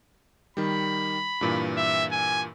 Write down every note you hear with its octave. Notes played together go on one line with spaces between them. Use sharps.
D#3 G3 B5
G2 A#2 E3
E5
G#5